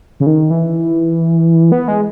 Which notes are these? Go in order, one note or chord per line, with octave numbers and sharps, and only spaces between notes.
C#3
D#3
E3
B3
G#3